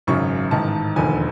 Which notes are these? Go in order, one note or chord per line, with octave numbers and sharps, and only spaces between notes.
G#1 F#2 C#3 F#3 C#6
A1 G#2 D#3 A5
E1 D#2 D3 F3 G#5